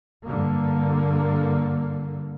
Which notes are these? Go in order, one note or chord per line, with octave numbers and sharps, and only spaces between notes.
G2 D3 A#3